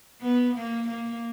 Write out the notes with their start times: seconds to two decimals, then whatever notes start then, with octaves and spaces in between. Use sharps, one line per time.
0.21 B3
0.54 A#3
0.88 A#3